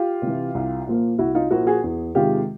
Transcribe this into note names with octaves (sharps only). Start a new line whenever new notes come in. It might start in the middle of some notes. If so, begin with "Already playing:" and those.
Already playing: F4 G4
C3 E3
C2
A#2 F3 A#3
C2 E4 F#4
D#4 F4
A#2 F3 A#3 E4 F#4
F#4 G#4
E2
C3 D#3 G#3 F4 G4